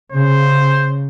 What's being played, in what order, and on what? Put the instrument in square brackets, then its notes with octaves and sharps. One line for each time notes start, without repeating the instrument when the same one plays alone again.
[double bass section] C#3 [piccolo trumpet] C5